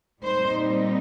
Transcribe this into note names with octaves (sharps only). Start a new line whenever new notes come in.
A#2 G3 C4 D#4 C5